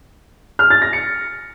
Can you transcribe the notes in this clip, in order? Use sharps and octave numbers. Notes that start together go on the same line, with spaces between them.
F6
A6
A#6
C#7